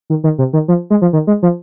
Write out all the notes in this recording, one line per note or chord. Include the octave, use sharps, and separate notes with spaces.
D#3
D#3
C3
D#3
F3
G#3
F3
D#3
G#3
F3